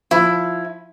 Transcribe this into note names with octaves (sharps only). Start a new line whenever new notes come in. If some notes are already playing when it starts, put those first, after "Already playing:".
F3 E4